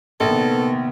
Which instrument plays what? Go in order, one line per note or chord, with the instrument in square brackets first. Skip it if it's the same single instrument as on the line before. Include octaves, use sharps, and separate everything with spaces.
[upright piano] A#1 [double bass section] C3 D#3 B3 [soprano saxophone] A4